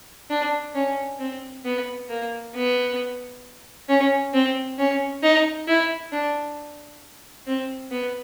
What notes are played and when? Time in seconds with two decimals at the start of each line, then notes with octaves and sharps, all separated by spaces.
0.30 D4
0.74 C#4
1.20 C4
1.65 B3
2.09 A#3
2.55 B3
3.89 C#4
4.34 C4
4.78 C#4
5.23 D#4
5.68 E4
6.12 D4
7.47 C4
7.91 B3